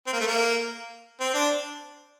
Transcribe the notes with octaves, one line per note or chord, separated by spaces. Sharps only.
C4
A#3
A3
A#3
C4
D4